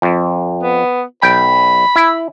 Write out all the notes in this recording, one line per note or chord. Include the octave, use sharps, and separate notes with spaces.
F2
B3
B1 G5 B5
E4